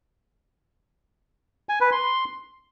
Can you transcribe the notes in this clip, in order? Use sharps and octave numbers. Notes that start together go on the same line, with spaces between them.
G#5
B4
C6